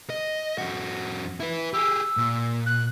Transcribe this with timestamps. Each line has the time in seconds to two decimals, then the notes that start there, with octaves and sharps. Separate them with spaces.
0.10 D#5
0.58 F2 F#4
1.40 E4 B4
1.74 G4 G#4 E6
2.17 A#2
2.66 F#6